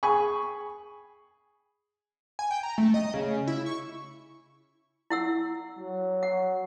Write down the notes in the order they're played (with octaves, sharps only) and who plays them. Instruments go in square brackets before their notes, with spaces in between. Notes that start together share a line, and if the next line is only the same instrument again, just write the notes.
[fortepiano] G#4 G#5 B5 C#6
[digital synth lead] G#5
G5
A#5
A3
D#5
C#3
E4
C#6
[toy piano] E4 F#5 E6
[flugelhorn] F#3
[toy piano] F#5